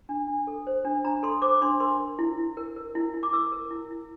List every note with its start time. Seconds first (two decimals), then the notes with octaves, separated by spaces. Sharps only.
0.09 D4
0.27 D4
0.47 A4
0.67 C5
0.85 D4
1.05 D4 A#5
1.23 A4 C6
1.42 C5 D6
1.62 D4 C6
1.80 A#4 C6
2.00 A#4
2.19 E4
2.38 E4
2.57 A#4
2.76 A#4
2.95 E4
3.14 E4
3.23 D6
3.33 A#4 E6
3.52 A#4
3.71 E4
3.91 E4